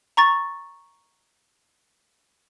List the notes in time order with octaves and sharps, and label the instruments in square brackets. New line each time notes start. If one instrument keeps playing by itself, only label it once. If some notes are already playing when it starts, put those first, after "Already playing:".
[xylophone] A#5 C#6 A6